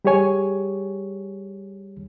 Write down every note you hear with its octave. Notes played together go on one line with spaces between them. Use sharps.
G3 G4 G#4 C#5 G#5